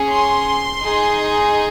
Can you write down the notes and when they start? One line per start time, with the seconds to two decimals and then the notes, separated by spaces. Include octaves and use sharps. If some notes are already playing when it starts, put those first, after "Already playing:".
Already playing: C#4 G#4
0.11 C6
0.82 D#4 G#4